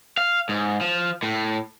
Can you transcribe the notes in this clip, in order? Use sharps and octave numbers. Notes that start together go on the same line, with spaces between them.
F5
G#2
F3
A2